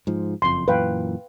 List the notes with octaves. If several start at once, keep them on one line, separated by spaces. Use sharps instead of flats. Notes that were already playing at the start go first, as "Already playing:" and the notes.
G#2 F3
F#1 F2 C6
F#2 A#2 E3 B4 F5 G5